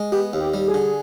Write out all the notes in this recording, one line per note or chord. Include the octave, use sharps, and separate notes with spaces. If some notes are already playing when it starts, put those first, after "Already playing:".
Already playing: G#3
B3 G4
D#2
G4
G3
G#4
D3